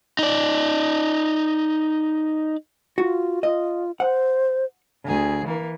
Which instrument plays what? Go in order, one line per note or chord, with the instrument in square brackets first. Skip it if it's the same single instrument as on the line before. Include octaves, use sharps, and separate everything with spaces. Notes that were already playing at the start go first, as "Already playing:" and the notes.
[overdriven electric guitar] D#4 D5
[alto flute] F4 [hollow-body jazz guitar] F#4
[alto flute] F4 [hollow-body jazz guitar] D#5
[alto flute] C5 [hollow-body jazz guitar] F#5
[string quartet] D2 G#4
E3 A#3